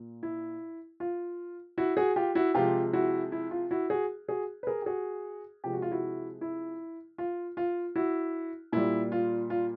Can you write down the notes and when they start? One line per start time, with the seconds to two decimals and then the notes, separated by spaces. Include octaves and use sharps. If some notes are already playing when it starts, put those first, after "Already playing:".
Already playing: A#2
0.23 E4
1.00 F4
1.78 E4 F#4
1.97 F#4 G#4
2.16 F4 G4
2.35 E4 F#4
2.54 C3 F3 G#3 F4 G4
2.93 E4 F#4
3.32 E4
3.51 F4
3.71 E4 F#4
3.90 F#4 G#4
4.28 F#4 G#4
4.63 B4
4.67 G#4 A#4
4.82 G4
4.86 F#4 G#4
5.64 C3 F3 G#3 G4
5.73 F#4
5.82 F4
5.91 E4 F#4
6.41 E4
7.18 F4
7.57 F4
7.96 E4 F#4
8.72 A#2 G3 E4
9.12 F4
9.50 F4